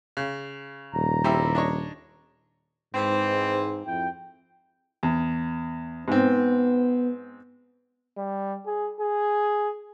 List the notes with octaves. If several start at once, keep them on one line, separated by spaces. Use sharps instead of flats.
C#3
D#1 A#5
G3 C4 E4
D4 D#4 C#5
G#2 E3 C4
F2 E4 G5
E2
G#2 B3 C4
G3
G#4
G#4